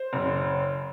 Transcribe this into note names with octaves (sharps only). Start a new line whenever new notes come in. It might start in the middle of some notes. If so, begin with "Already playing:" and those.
Already playing: C5
F#1